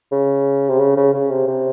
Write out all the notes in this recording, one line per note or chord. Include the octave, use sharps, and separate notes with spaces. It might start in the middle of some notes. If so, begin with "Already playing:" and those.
C#3
C3
C#3
C#3
C#3
C3
C3